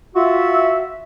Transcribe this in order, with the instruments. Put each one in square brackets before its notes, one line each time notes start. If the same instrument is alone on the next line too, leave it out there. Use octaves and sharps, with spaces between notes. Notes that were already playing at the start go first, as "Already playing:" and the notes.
[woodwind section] F4 E5 [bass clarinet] F#4